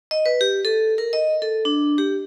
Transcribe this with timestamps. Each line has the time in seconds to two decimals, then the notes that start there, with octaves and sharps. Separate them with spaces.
0.11 D#5
0.26 B4
0.41 G4
0.65 A4
0.98 A#4
1.13 D#5
1.42 A4
1.65 D4
1.98 G4